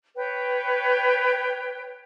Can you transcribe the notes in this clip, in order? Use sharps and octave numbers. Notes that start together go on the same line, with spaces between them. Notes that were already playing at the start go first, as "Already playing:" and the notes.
B4 C#5 G5